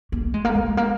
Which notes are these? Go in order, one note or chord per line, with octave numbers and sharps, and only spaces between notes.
A#3
G#3
A#3
G#3
A#3